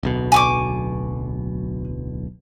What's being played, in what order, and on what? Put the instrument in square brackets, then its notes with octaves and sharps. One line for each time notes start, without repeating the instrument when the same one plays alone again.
[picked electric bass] D1 B1 B2
[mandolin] G#5 C#6 D6